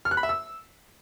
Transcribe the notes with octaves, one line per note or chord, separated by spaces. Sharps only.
F6
F#6
B5
E5
E6